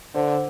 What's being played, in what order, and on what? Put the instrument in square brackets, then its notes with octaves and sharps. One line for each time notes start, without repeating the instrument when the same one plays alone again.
[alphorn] D3 [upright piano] C5